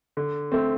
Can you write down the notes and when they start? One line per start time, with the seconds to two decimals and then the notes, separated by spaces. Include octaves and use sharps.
0.17 D3
0.52 A3 C4